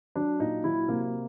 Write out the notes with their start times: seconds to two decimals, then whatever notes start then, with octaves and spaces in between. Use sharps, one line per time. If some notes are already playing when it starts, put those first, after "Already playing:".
0.16 F#3 D4
0.40 A#2 D#4
0.64 F#3 E4
0.88 C3 A#3